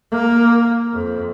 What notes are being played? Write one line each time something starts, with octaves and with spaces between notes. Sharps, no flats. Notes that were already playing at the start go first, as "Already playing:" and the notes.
A#3
F2